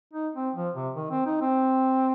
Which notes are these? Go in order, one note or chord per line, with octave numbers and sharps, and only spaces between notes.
D#4
C4
F3
C3
D#3
C4
D#4
C4